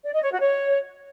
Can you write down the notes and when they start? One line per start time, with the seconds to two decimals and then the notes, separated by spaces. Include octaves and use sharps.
0.04 D5
0.13 D#5
0.22 C#5
0.31 F#4
0.40 C#5